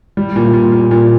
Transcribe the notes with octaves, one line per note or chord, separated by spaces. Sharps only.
G3
A#2
A#2
A#2
A#2